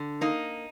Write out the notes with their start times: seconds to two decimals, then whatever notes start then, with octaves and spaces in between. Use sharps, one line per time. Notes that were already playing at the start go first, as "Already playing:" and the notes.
Already playing: D3
0.21 A#3 D#4